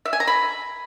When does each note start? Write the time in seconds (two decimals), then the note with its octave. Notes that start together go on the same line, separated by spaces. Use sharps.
0.05 E5
0.13 G#5
0.20 A#5
0.27 B5